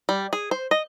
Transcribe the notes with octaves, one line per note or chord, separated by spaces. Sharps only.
G3
G#4
C5
D#5